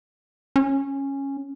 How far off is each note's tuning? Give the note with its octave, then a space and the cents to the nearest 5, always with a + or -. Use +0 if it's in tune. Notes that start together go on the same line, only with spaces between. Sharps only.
C#4 -10